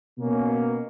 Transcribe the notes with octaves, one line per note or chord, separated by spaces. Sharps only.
B2 A#3 C#4